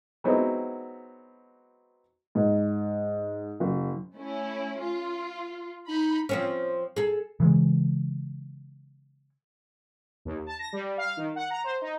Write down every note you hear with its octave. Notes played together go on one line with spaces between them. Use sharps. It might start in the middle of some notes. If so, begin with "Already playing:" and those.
F#3 G#3 B3 C4 D#4 E4
G#2
F#1
A3 C#4 E4
F4
D#4 B5
F3 C4 C#4
G#4 A4
C#3 E3 G#3
D#2
A5
A#6
G3
F5
D#3
F#5
A#5
C5
D#4